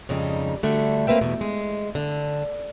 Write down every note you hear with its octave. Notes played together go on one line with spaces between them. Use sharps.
F2 G#2 C#3 G3 D#4
D3 G3 A3 F#4
A#3 C4 B4 E5 G5
E2 B2
G#3
D3